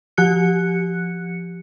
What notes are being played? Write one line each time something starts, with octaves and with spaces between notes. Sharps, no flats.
F3 G4 F#6 C#7